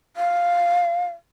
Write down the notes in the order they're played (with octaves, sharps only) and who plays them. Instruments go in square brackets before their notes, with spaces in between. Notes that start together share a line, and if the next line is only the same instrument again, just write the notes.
[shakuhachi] F5